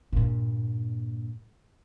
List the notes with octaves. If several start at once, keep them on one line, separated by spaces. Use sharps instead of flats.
G2 A#2